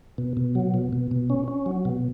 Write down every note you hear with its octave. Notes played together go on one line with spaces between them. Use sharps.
B2
B2
F#3
B2
B2
B2
C#4
C#4
F#3
B2